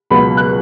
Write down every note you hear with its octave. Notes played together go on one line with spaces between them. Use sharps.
C#2 B2 F#3 B5
F#6